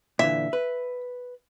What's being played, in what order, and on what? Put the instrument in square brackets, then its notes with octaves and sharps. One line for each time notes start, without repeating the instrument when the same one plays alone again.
[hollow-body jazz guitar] A#2 D3 E3 [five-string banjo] E5
[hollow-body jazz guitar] B4